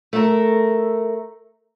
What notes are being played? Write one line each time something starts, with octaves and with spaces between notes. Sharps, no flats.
A3 A#4